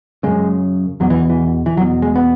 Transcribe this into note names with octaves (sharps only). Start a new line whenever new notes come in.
F#2 C#3 G#3
E2 B2 F#3
E3
E3
E3
E2 B2 F#3
G#3
B3